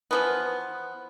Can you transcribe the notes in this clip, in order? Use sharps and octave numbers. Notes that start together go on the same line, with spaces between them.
E3 F3 B3